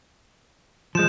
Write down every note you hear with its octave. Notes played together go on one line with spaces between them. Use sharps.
F3 G#3 G6 E7